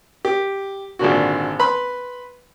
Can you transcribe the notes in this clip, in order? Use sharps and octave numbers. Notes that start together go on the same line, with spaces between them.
G4
G#1 A#2 D3 F#4
B4 B5 C6